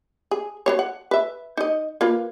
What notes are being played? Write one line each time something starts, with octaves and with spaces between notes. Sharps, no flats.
G#4
F#3 C4 C#5
F#5
B4 E5
D#4 D#5
A#3 F4 B4